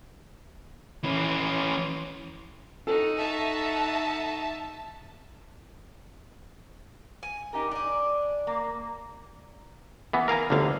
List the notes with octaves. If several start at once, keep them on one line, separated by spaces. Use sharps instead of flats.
E3 C#4
D#4 F#4 A4
E5 A5
G#5
D#4 G4 A#4
D4 D5 G#5
A#3
E3 B3
A#4 F5 G#5 A#5
G1 D2 D3 F5